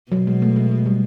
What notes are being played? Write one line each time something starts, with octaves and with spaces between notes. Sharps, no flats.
B2 F#3
G#3
A3
G#3
G#3
G3